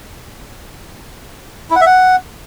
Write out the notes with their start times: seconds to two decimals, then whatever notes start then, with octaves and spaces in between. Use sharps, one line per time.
1.71 E4
1.76 F#5
1.81 E5
1.86 F#5